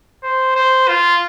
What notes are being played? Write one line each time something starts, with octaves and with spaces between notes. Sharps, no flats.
C5
C5
F4